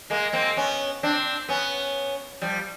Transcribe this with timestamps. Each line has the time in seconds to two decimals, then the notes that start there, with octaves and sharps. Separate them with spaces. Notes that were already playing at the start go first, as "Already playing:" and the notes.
0.10 G#3 A#3
0.33 A#3 C4
0.57 B3 C#4
1.03 C4 D4
1.49 B3 C#4
2.42 F3 G3